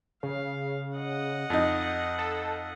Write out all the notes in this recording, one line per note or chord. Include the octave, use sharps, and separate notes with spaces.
C#3 F5
D#5 F#5
F2 D#4
A4